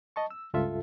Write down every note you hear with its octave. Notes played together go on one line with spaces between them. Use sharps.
D#5 A5 C#6
E6
C#2 G2 F4 A4 E5